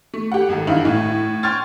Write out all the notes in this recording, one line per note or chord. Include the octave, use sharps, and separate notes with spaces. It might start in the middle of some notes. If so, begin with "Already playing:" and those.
A3
G4 F#5
G#1 G#2 A4
G2 E3 D#4 E5 F5 F#7
A2
G5 C6 C#6 F6 G#6 A6